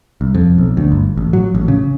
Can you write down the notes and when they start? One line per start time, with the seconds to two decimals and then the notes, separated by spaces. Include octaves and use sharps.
0.21 C2
0.35 F2
0.58 B1
0.77 D2
0.92 G1
1.17 A1
1.33 F#3
1.55 A1
1.68 C#3